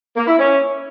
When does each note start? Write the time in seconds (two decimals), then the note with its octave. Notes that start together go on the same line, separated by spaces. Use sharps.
0.17 A#3
0.28 E4
0.38 C#4